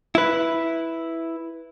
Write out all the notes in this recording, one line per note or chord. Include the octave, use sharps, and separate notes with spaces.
E4 B4